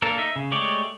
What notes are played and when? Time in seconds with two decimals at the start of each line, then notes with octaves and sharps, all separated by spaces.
0.02 A#3 D4 A4 A#4
0.18 D#4 E5
0.36 C#3
0.51 G#3 A3 G4 C#5 D5